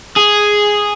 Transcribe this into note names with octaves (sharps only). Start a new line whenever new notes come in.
G#4